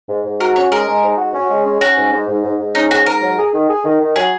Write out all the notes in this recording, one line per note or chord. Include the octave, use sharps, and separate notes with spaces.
G#2
G#2
F#4 A#4
C#4 C#5
G#3 A#4
G#3
G#2
F#4
C#4
G#3
C#4
C#4 F#4
G#2
G#2
G#2
G#2
G#2
C#4 D#4
G#2 F#4
G#2 A#4
F#3
G#4
D#3
G#4
D#3
D#3
F#3 G#4